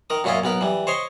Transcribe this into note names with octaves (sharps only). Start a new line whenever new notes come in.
D#3 A#4 D#6
F#2 A#2 C#4 E4 F4 D#5
B1 B3 A#4 B5
E3 G3
C5 C#5 D#5 C6